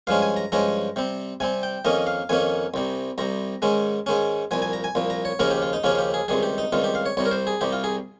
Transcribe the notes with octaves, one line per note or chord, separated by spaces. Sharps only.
G2 F3 G#3 C#4 F5
G#5
A#5
G2 F3 G#3 C#4 A#5
C3 G3 C4
C3 G3 C4 G#5
G5
F2 D#3 A#3 C#4 D#5
F5
F2 D#3 A#3 C#4 G#5
C2 C3 G3
C2 C3 G3 A#5
G#2 D#3 G#3 C#4
G#2 D#3 G#3 C#4
C2 A#2 F3 G#5
G#5
A#5
G#5
C2 A#2 F3
A#5
C#5
D#2 C#3 F3 A#3 C#4 A#4
G4
F4
D#4
D#2 C#3 F3 A#3 C#4 F4
G4
G#4
C#2 C3 D#3 G3 G#4
G4
D#4
C#2 C3 D#3 G3 F4
G4
F5
C#5
C2 C3 G3 C#5
A#4
C5
G#4
C2 C3 G3 G4
F4
G#4